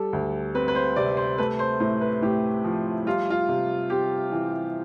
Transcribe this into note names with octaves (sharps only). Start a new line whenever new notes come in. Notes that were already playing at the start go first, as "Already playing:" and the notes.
Already playing: G3 A4
D2
C4 B4
B4
C5
C3 D5
C5
A3 B4
C5
A2 C5
B4
A2 G4
F3
G3 F4
F4
C3
C4 G4
E3